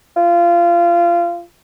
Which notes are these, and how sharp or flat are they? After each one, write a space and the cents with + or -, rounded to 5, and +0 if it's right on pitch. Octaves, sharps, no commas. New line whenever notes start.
F4 -25